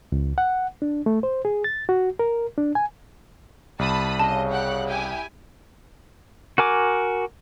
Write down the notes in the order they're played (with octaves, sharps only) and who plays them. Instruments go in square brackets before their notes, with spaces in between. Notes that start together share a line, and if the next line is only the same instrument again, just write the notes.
[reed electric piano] C#2
F#5
D4
A3
C5
G#4
A6
F#4
A#4
D4
G#5
[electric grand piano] C2 [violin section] A5 B5 D#6
[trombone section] C#3 [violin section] D#5 [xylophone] A5
[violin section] G4 F#5 F#6
E4 G4 G#5
[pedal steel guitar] F#4 A#4 G#5 D6